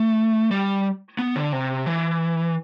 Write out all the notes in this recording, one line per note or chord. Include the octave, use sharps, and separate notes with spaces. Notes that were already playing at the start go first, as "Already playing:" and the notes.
Already playing: A3
G3
B3
D3
C3
E3